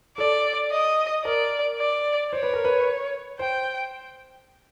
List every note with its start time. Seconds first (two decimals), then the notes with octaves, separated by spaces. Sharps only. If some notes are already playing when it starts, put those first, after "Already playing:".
0.18 A4 D5
0.71 D#5
1.25 A#4 D5
1.79 D5
2.32 C5 C#5
2.43 B4
2.54 A#4
2.65 B4
3.39 C5 G5